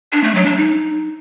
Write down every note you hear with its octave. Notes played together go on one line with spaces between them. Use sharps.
D4
A3
F#3
D4
D#4